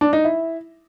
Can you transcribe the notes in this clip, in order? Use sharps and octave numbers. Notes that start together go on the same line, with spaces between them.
D4
D#4
E4